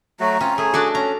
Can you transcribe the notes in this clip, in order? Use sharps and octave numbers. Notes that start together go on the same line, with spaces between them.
F#3 A3 F#4 A#5
C4 C#4 F4
A3 G#4 G#5
D4 F#4 A4 D5
C#4 A#5